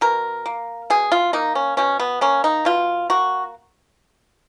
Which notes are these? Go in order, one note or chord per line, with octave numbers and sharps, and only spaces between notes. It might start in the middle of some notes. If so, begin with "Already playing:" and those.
B2 A#4
A#3
B2 G#4
F4
A#3 D#4
C#4
B2 C#4
B3
A#3 C#4
D#4
B2 F4
A#3 F#4